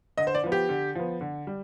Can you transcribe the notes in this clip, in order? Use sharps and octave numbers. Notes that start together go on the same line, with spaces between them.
D3 D#5
C5
D5
F3 B3
G4
D3
F3 B3
D3
G3